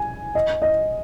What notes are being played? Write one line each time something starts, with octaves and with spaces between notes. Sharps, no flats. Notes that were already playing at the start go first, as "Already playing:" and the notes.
Already playing: G#5
D#5
D#5